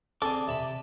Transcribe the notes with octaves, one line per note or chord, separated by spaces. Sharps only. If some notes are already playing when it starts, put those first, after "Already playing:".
C4 G#4 A4 D5 D6
C3 A5 B5